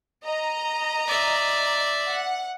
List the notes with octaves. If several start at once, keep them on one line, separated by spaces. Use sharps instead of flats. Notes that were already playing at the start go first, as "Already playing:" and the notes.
D#5 A#5
D5 E5
F#5